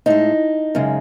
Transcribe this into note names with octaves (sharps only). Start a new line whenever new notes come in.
A2 G#3 D#4
F#2 C#3 G#3